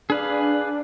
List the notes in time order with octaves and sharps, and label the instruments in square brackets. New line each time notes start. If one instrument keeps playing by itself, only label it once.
[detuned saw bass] D4 [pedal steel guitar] G#4 B4 F5